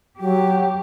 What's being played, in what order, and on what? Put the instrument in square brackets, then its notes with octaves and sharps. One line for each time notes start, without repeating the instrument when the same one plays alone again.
[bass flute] F#3 [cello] G4